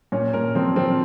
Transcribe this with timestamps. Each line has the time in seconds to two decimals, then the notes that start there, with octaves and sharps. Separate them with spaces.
0.12 A#2 C#4
0.33 A#2 A#4
0.55 F3 C4
0.76 F3 C4